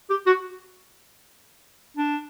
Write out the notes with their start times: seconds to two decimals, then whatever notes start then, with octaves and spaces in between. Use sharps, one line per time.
0.10 G4
0.26 F#4
1.97 D4